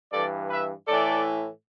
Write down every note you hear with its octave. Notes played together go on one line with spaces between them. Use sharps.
G2 E3 A4 D5
B4 E5
A2 E3 A4 D5